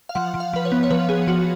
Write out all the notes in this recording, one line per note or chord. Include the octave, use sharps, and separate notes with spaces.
F5
F3 F#5
F3
F5
F3 B4
C#5
B3
C#5
F3 B4
B3 G#4
F3 F#4